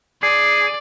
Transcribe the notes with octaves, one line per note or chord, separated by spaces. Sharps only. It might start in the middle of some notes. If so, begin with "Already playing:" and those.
G#4 D5